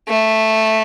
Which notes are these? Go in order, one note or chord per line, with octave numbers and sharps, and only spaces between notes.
A3